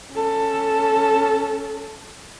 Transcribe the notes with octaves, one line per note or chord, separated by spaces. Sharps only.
C#4 A4